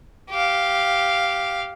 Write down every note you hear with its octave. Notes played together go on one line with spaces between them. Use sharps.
G4 F5